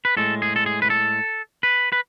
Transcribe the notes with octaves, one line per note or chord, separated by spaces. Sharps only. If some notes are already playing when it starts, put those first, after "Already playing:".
B4
A2 G#3 A4
G#4
A4
G#4
B4
A4
B4
B4